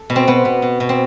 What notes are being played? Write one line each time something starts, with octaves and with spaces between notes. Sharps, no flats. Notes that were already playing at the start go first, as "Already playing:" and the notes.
Already playing: A4
B2
C4
B2 B3
B2
B2
B2
C4